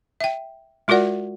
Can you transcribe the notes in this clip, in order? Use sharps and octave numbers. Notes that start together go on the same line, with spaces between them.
E5 G5
G#3 F4 F#4 A#4 D5 F#5